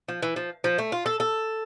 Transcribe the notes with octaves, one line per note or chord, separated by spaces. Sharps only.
F3
E3
F3
F3
A3
F4
A4
A4